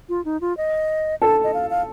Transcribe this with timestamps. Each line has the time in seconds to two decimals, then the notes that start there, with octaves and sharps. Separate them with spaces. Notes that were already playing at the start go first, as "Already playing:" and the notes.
0.09 F4
0.25 D#4
0.41 F4
0.57 D#5
1.22 A4 A5
1.44 D#5
1.54 F5
1.70 F5